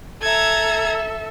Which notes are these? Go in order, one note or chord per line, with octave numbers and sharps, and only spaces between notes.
A4 E5 A#5 G#6